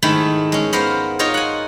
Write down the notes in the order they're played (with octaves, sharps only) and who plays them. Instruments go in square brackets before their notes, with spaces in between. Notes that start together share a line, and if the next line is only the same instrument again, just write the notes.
[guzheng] G#2 D#3 A3 E4
G#3 C#4
B3 A#4 C5 F5
D#4 F4 A#4 C#5 D#5
F#5 G#5